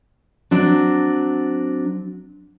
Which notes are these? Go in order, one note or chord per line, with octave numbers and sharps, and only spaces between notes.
F#3 C4 D4